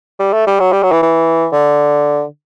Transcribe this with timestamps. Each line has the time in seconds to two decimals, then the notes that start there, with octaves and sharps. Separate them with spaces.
0.19 G3
0.33 A3
0.47 G3
0.60 F#3
0.72 G3
0.83 F#3
0.92 E3
1.03 E3
1.52 D3